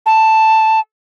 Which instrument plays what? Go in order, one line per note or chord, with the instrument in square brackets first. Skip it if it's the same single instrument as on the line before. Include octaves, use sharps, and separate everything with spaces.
[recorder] A5